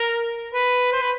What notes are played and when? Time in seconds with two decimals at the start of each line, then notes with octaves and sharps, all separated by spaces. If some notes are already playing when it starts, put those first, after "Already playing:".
Already playing: A#4
0.54 B4
0.92 C5
1.02 B4